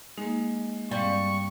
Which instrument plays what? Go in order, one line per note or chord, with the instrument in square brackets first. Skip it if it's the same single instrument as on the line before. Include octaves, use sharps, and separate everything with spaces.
[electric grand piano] G#3 [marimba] A#3 D#4
[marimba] G2 C4 F5 [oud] G3 [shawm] C#6